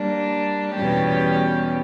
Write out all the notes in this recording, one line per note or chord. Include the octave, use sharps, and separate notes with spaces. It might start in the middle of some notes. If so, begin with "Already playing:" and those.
Already playing: G3 A#3 D4
E2 B2 G3 C#4 G4